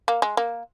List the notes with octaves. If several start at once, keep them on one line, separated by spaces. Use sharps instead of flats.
A#3
G#3
A#3